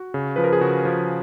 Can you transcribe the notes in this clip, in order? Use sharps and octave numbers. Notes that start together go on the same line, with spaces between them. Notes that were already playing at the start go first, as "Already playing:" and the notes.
Already playing: F#4
C#3
F3 B4
A#4
G#4
C#3 F#4
F3